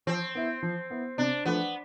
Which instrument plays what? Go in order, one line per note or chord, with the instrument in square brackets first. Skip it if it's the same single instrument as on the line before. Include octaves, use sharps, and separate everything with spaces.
[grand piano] F3 [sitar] C4
[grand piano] B3 E4
F3
B3 E4
[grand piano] C3 [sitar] D4
[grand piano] F3 A3 D4 [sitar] B3